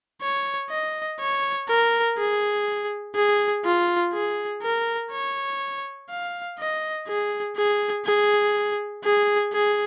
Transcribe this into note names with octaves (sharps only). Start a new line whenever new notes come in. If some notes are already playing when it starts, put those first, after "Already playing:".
C#5
D#5
C#5
A#4
G#4
G#4
F4
G#4
A#4
C#5
F5
D#5
G#4
G#4
G#4
G#4
G#4